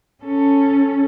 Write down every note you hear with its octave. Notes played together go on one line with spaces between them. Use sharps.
C#4 A4